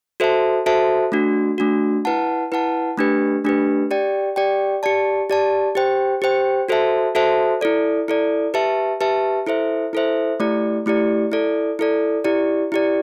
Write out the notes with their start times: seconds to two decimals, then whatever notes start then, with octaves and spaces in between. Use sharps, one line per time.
0.20 F#4 A4 C5 E5 A5
0.66 F#4 A4 C5 E5 A5
1.12 A3 D4 F#4
1.58 A3 D4 F#4
2.05 E4 B4 F#5 A5
2.52 E4 B4 F#5 A5
2.98 A3 D4 G4 B4
3.44 A3 D4 G4 B4
3.91 G4 D5 G5
4.36 G4 D5 G5
4.83 G4 D5 A5
5.30 G4 D5 A5
5.75 G4 C5 G5
6.22 G4 C5 G5
6.69 F#4 A4 C5 E5 A5
7.15 F#4 A4 C5 E5 A5
7.61 E4 A4 D5
8.08 E4 A4 D5
8.54 G4 B4 E5 A5
9.01 G4 B4 E5 A5
9.47 E4 A4 C5 E5
9.93 E4 A4 C5 E5
10.40 A3 E4 G4 D5
10.86 A3 E4 G4 D5
11.32 E4 A4 D5
11.79 E4 A4 D5
12.24 E4 G4 D5
12.72 E4 G4 D5